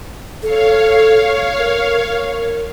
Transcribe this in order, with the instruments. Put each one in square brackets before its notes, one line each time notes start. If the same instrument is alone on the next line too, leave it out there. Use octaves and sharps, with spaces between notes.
[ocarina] A4 [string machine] C#5 F5
[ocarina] A#4